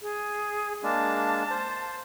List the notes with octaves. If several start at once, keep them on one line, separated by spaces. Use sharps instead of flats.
G#4
G#3 A#3 D4 A5
C5